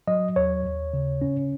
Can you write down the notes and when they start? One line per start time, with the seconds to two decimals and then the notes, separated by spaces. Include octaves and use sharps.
0.08 F#3 D#5
0.36 D#2 C#5
0.65 D#2
0.94 C#3
1.22 C#4